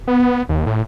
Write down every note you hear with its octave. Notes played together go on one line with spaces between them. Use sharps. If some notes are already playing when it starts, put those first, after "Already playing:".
B3
D#2
A2